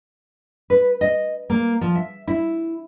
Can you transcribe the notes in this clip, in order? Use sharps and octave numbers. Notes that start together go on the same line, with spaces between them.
B4
D#5
A#3
F3
E5
E4